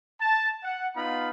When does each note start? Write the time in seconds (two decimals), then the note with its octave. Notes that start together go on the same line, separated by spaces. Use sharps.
0.20 A5
0.64 F#5
0.96 B3 D#4 F4 F5 B5